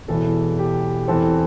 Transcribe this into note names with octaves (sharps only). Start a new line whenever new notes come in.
E1 E2 E3 A4
G4
E2 E3 C4 A4